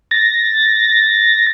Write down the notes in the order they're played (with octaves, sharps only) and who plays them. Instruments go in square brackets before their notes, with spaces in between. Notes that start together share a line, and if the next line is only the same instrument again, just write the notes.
[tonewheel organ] A6 A#6